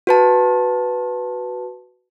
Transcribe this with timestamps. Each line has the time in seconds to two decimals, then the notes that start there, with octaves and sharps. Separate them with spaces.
0.07 F#4 B4 A5